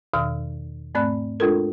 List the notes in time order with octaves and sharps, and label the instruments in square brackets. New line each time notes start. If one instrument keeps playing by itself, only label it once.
[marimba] E2 B2 D#3 E6 F6
G#2 A3 C4 D5 B5 F#6
G#3 D4 F4 A4 A#4